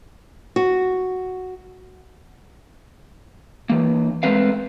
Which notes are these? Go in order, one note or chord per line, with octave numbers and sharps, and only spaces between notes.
F#4
E3 A#3
G#3 A3 C4 B4 F5